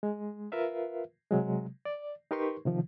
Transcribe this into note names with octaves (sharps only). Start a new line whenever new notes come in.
G#3
F4 A#4 B4 E5 F5
C3 F#3 G#3
D5
D#4 G4 A#4 B4 C6 C#6
C3 D#3 F3